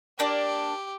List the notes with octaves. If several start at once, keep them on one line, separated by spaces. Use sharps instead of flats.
A#3 D4 G4 D5